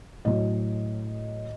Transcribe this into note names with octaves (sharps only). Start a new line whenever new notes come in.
A2 F#3 D#5